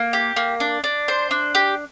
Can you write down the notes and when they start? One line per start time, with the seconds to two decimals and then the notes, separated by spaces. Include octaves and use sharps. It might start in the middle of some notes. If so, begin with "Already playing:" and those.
Already playing: A#3
0.13 G4
0.36 A#3
0.60 D4
0.84 D4
1.08 C5
1.31 D4
1.55 G4